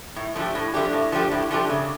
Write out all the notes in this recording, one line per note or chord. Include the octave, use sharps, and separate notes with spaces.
A2
F3 A3 D4 G4
A2
F3 A3 D4 G4
A2
F3 A3 D4 G4
A2
F3 A3 D4 G4
C#3